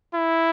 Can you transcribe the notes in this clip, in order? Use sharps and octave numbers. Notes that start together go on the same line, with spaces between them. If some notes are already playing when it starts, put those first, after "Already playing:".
E4